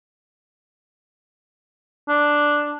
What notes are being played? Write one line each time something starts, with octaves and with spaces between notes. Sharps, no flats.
D4